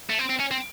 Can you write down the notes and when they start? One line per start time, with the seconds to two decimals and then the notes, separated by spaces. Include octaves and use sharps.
0.10 A3
0.19 C4
0.30 C4
0.40 C#4
0.51 C4